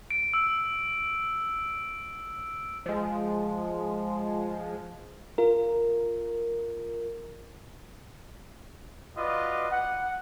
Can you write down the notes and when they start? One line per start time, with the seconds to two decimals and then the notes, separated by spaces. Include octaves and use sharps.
0.11 D7
0.34 E6
2.86 F3 G#3
5.38 F4 A#4
9.16 F4 F#4 B4 D5 D#5
9.71 F#5